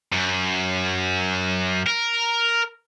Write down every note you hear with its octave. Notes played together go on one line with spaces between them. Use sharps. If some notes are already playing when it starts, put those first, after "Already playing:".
F#2
A#4